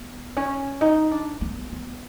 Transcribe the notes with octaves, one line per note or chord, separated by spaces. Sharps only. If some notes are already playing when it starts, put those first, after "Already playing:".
Already playing: B3
C#4
D#4
D4
B3
B3